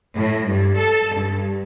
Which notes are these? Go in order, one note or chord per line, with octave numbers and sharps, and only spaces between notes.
A2
G2
A4
G2